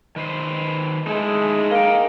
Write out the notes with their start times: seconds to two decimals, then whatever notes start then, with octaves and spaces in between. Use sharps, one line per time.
0.16 D#3 B4 C5
1.07 G#3 D#4 E4 A4
1.71 A#3 D#5 G5